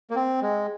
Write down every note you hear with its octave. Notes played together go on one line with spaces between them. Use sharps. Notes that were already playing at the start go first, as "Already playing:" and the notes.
A#3
C4
G#3